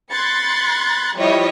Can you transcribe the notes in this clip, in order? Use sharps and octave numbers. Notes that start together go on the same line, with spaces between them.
B5 C6 F#6 G#6 A6 C#7
F3 G3 E4 C#5 D#5